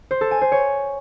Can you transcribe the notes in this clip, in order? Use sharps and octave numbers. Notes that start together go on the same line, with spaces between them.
C5
A4
G#5
C5
C#5